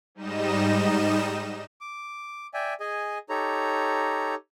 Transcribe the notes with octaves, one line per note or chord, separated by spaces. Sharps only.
G#2 G3 D#4 D#5 E7
D6
D5 E5 G5 G#5
G#4 D#5 G#5
D#4 G4 A4 C#5 A#5